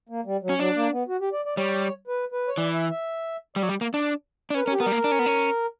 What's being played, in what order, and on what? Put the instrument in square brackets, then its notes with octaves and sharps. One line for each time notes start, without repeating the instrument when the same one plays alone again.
[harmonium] A#3
G3
F#3
[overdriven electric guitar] C#4
[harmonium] F#3 [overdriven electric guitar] D4
[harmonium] A#3
B3
F#4
G4
D5
D5
[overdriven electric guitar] G3 [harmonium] C#5
[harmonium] B4
B4
C#5
[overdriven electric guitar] E3 [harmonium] D5
[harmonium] E5
E5
[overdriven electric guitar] G3 [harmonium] D5
[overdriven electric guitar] F#3
G3
A#3
D4
D4
[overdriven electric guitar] C#4 [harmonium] B4
[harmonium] A#4
[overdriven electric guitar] C#4
[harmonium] G4
[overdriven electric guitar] B3 [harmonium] A#4
[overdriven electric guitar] G3
A#3
D4
C#4
B3
C#4